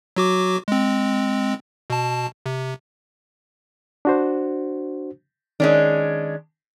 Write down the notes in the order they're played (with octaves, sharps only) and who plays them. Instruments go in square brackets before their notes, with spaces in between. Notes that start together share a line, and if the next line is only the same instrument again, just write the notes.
[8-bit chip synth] F#3 F#4 D6
G#3 C4
B2 A5
C3
[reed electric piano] D4 F#4 C5
[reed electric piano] D#3 [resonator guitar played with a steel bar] G#3 C#4 D4